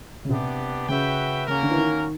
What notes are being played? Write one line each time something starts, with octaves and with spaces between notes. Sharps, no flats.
C#3
C3 B3 D4 G4
C#3 F#4 B4 E5 G5
C#3 A#3 C#4 F#4 A#4
D3
E3
D#3